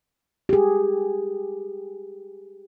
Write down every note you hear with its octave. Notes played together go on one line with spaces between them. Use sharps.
G4 G#4